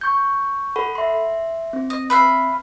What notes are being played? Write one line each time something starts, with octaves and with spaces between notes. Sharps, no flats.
C#6 G6
A4 F#5 B5
E5 C6
C4
D#5
B4 E5 F5